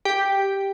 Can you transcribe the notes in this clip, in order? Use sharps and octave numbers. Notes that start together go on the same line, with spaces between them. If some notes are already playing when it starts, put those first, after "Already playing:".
G4